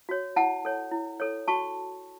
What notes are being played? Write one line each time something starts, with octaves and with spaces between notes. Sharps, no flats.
F#4 C#5
E4 F#5 A5
A4 C#5
E4
A4 C#5
F#4 A5 C#6